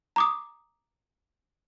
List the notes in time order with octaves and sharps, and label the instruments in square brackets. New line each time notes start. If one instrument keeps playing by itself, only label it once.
[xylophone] A#5 D6 D#6